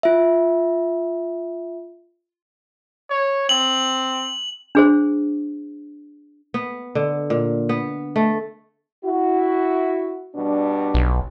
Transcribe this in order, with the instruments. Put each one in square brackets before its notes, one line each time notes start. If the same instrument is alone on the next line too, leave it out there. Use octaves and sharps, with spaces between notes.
[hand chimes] F4 E5
[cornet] C#5
[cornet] C4 [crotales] F#7
[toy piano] D4 G#4 C5
[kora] B3
D3
A#2
B3
A3
[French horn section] E4 F#4
B2 G3 D4
[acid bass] B1